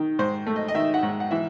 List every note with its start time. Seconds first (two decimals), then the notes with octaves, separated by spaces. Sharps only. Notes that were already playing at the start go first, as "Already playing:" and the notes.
Already playing: D#3
0.19 G#2 C5
0.46 A3
0.56 D#5
0.68 D#5
0.75 D#3 E5
0.94 F#5
1.03 G#2
1.20 F#5
1.31 E3 E5